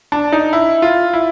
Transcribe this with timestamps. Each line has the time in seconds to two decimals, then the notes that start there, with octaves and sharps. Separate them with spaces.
0.12 D4
0.32 D#4
0.53 E4
0.82 F4
1.13 E4